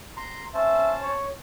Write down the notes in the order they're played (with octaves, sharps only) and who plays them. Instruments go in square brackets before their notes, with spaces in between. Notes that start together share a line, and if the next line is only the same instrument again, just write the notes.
[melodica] A#5 C6
[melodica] C#4 C5 A5 [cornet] E5
[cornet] C#5